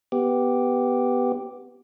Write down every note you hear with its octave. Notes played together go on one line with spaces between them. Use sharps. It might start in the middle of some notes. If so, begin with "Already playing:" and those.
B3 G4